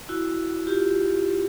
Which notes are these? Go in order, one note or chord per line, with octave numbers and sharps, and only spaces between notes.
E4 F#4
F4 G4